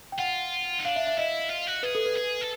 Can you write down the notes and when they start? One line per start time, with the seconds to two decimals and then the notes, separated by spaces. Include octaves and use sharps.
0.12 G5
0.18 F4 F#5
0.79 D#4
0.84 D4 F5
0.96 E5
1.07 E5
1.17 E4 D#5
1.50 F4
1.67 F#4
1.83 G#4 B4
1.95 A4
2.06 B4
2.17 G#4
2.41 A4